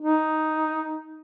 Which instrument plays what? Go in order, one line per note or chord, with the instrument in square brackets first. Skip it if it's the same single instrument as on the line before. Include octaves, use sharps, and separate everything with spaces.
[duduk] D#4